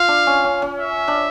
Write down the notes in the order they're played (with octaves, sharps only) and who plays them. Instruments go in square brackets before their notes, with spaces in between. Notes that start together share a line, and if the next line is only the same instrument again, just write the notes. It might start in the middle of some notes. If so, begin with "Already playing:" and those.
Already playing: [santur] F4 [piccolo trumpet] F5
[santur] D4
C#4
C#4
C#4
[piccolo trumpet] E5
[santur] D4